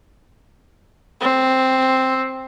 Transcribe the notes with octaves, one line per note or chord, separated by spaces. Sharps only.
C4